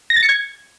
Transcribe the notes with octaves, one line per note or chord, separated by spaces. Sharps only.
A#6
A6
C#7
G#6